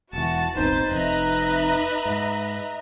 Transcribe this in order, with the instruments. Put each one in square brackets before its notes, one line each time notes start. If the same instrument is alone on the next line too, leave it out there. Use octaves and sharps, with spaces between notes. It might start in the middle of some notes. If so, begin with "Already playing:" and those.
[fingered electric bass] E1 E3 [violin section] F#4 [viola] A5
[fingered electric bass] D#1 G#1 C4 [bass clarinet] D#4 [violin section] B4 A6 [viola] C5
[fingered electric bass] F1 F2 [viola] B4 [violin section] D#5 E5 A#5
[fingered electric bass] G#2